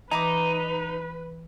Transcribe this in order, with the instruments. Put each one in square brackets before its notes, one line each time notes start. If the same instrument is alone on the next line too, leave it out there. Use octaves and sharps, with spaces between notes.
[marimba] E3 [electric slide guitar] D#4 [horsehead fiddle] B4 [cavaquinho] A#5 B5 D6